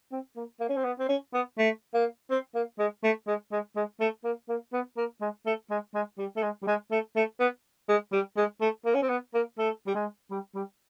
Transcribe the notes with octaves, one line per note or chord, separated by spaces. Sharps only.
C4
A#3
A#3
C#4
C4
B3
C4
C#4
B3
A3
A#3
C4
A#3
G#3
A3
G#3
G#3
G#3
A3
A#3
A#3
B3
A#3
G#3
A3
G#3
G#3
G3
A3
G#3
G3
G#3
A3
A3
B3
G#3
G3
G#3
A3
A#3
C#4
C4
B3
A#3
A3
G3
G#3
G3
G3